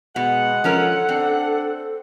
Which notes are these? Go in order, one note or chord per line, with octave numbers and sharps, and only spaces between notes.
B2 G#3 F#5
F3 C#4 A4 A#4
C4 D4